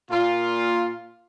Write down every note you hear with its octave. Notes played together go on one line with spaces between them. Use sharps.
A#2 F4